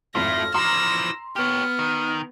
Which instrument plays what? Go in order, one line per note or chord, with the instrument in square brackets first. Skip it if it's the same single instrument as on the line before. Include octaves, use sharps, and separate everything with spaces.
[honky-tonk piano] G#1 F2 C6 [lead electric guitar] A3 E4 [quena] F6 [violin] A#6
[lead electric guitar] E3 F3 [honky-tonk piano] A#5 C6 [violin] E6 A#6
[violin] B3 [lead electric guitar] G4 C#5 [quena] F6
[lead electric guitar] D#3